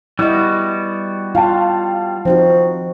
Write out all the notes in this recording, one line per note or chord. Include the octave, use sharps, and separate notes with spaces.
G3 B3 E4 F#4 D#5
F4 F5 G5 A5
F3 C4 D#4 F#4